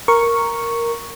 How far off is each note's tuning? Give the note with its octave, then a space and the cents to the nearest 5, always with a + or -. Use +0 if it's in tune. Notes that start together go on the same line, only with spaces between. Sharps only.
A#4 +0 C#6 +0